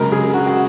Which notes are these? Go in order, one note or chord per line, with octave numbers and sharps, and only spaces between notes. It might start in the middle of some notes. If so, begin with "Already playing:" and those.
Already playing: F#2 C#3 G#3 A#4
G#4
F#4
F#4